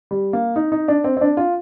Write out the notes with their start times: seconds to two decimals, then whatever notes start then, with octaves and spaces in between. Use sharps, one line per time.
0.11 G3
0.33 A#3
0.56 D#4
0.72 D#4
0.88 D4
1.04 C4
1.17 C4
1.21 D4
1.37 F4